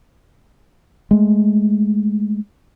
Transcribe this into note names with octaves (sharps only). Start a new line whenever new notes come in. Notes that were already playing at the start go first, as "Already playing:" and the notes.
G#3 A3